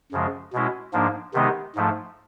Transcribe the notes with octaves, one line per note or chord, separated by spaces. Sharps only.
F#2 C#3 F3 G#3
B2 G#3 C#4 E4
G#2 F3 A#3 D4
C3 D#3 G#3 B3 D#4
G#2 F3 A3